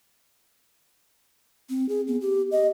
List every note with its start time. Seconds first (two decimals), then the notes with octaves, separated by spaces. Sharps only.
1.70 C4
1.89 G#4
2.07 B3
2.21 G4
2.52 D#5